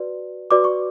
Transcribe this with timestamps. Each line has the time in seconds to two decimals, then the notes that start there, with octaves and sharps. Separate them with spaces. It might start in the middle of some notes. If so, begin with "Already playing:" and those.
Already playing: F#4 B4 D5
0.51 F#4 B4 D5 D6
0.64 C#6